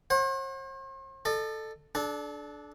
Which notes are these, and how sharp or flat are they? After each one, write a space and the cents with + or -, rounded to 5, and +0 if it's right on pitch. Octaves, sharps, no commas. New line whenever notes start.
C5 +45 F#5 +0
A4 +0 D#5 -45
D4 +0 A4 -40